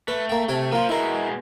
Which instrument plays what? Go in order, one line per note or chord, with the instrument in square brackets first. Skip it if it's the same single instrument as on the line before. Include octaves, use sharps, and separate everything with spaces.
[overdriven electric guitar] A3 [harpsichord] B4
[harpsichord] A#3 G5
C3 G5 G#5
[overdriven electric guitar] F3 [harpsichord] A#3 F4
[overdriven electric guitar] B2 G#3 [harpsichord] E4 A#4